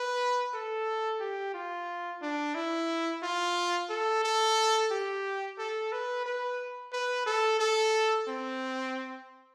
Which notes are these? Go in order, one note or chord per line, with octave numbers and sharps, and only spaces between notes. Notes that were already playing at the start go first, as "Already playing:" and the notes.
Already playing: B4
A4
G4
F4
D4
E4
F4
A4
A4
G4
A4
B4
B4
B4
A4
A4
C4